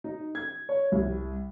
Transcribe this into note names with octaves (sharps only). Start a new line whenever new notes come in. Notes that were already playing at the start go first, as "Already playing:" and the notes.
D#4
G#6
C#5
C2